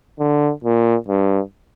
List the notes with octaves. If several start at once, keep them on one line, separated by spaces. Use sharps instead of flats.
D3
A#2
G2